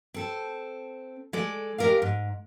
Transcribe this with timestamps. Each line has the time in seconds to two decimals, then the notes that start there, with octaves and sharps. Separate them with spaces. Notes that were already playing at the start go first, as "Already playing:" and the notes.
0.14 C4 A4
1.33 G#3 A4 D5
1.78 G#3 G4 G#4 A#4 D5 F5
2.02 G#2